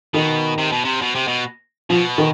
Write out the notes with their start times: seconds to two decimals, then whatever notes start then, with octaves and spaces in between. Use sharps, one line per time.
0.14 B2 D#3
0.58 C3
0.72 B2
0.84 C3
1.01 B2
1.15 C3
1.27 B2
1.90 B2 F3
2.18 D#3